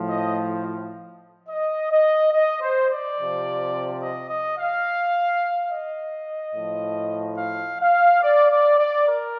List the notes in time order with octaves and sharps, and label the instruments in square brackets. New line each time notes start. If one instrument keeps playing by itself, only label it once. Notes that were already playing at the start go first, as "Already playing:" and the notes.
Already playing: [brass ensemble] A2 F3
D#5
D#5
D#5
D#5
C5
D5
C3 F3
D#5
D#5
F5
D#5
A2 F3
F5
F5
D5
D5
D5
A#4